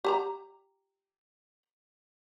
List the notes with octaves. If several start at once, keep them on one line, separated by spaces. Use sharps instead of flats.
G4 A5 A#5